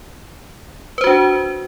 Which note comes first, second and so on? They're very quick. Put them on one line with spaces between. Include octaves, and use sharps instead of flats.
B4 C5 F#4 D4